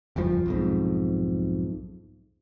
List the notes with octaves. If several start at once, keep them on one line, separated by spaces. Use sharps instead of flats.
F#1 E2 G2 F3
B1 F2 G#2